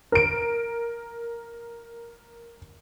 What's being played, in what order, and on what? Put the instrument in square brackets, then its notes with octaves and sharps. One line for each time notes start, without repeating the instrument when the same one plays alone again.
[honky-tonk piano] A#4 D7